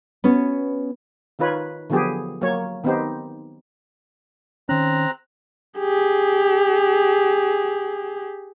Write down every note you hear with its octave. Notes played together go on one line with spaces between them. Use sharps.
B3 C#4 F#4
D#3 D#4 F4 B4 C#5
D3 F3 F#3 B3 G4 G#4
F#3 A#3 C#5
D#3 B3 C4 D#4 G4 C5
D#3 C4 C#4 A#5 F#6
G4 G#4